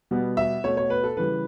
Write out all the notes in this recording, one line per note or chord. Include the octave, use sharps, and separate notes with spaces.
B2 G3 B3
E5
B2 A3 C#5
C#5
B4
A4
C#3 E3 G3 B4